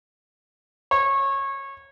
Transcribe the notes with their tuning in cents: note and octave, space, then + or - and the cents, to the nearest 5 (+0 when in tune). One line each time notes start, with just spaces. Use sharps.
C#5 -20